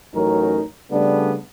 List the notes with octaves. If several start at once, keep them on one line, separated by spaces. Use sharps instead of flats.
A1 F#3 C#4 D#4 A#4
C#3 G3 A3 B3 D4